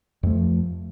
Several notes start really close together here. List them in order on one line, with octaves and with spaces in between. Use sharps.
F2 A3 F3